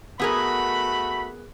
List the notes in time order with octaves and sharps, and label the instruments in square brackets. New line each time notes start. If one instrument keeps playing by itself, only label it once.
[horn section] A3 F#4 B5 [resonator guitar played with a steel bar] B3 G#4 A#4